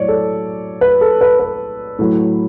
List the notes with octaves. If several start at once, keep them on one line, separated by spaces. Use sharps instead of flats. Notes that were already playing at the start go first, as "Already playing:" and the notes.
Already playing: A2 F#3 C#5 D5
A4
B4
A4
B4
B4
A2 F#3